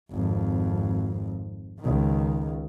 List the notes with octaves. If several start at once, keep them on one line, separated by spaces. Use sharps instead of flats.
G#1 F2
C#2 D#3